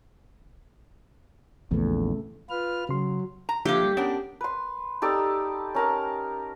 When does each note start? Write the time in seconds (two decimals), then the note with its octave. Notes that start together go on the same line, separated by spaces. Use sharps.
1.71 A#1 E2 C#3 A3
2.50 F4 B4 F6
2.89 C#3 F#3 C6
3.49 A#5
3.65 D3 F3 A#3 G4 E5
3.83 G3
3.97 B3 C#4 D4 A#4
4.41 B4 C6
5.02 D#4 G4 A4 D5
5.75 C#4 A#4 A5